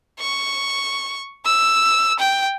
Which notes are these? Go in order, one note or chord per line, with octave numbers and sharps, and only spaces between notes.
C#6
E6
G5